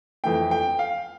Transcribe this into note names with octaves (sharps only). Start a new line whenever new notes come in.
F2 E3 A3 G5
G5
F5